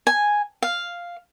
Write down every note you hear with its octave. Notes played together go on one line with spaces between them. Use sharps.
G#5
F5